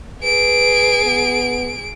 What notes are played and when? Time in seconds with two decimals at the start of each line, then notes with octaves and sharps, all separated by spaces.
0.23 G#4 B4 D7
1.04 B3